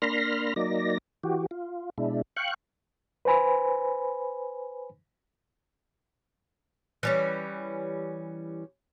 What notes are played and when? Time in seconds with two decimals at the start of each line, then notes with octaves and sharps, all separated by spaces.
0.02 A#3 D4 B5 C6 F6 A#6
0.56 F#3 A#3 D#4 D5 A#6
1.23 E3 F#4 G4
1.51 F4
1.98 B2 G#3 D4 E4
2.37 F5 G5 C#6 F#6
3.25 B4 C5 G#5 B5
7.03 E3 G3 C#4